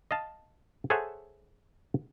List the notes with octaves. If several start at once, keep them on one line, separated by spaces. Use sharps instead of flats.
D#5 F5 A5
G#4 A4 C5 C#5 E5 F#5